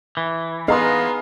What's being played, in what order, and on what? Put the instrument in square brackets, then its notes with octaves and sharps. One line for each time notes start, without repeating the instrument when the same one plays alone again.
[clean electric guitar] E3
[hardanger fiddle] B3 [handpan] G#4 D#5 [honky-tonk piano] F5 A#5 C6